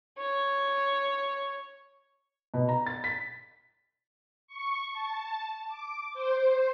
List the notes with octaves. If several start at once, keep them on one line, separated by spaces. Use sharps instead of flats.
C#5
B2
A#5
A6
B6
C#6
A5
D6
C5